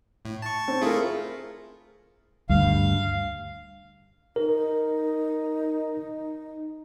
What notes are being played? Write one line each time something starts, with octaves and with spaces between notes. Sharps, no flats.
A2
A5 C#6
C4
A3 E4 F4 G#4 A#4
D2 G2 F5
D#4 A#4